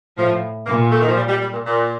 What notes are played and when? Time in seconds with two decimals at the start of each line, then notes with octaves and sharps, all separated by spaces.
0.17 A2 F3
0.66 A#2 A#3
0.92 A3
1.01 D#3
1.09 F3
1.17 G3
1.29 G3
1.42 G3
1.53 A#2
1.66 A#2